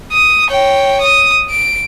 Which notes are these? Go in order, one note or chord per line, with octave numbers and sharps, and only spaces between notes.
D#6
C#5 G5
D#6
D7